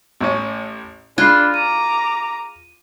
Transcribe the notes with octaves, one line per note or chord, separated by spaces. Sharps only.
A1 A2 C#4
G#3 D4 F4 B5 F#6 C7
A#5 D6 D#7